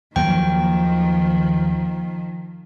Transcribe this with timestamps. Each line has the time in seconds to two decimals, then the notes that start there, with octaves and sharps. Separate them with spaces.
0.16 D#2 D#3 F3 F#3 A#3 G5